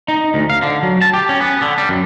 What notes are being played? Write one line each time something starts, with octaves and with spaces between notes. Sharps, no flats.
D#4
D2
F5
D3
F#3
A5
G4
C#4
B3
D3
G3
F#2